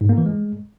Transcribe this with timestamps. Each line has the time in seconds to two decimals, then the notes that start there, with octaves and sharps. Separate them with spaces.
0.01 G#2
0.09 A#3
0.18 E3
0.26 G#3